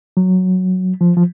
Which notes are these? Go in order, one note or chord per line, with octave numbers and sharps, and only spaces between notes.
F#3
F3
F3